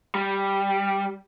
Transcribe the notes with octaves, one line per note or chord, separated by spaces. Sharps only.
G3